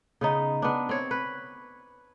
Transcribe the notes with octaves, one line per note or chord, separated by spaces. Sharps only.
C#3 B3 D#4
B3 D4
C4 C#5
B4